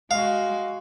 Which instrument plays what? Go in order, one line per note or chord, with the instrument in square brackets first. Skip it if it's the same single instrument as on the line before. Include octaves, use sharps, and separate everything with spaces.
[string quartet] G#3 F#4 [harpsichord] F5